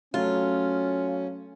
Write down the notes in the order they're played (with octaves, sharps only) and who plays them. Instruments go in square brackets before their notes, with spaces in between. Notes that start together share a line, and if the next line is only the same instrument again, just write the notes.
[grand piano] F#3 A3 [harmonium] C#4 [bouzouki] F4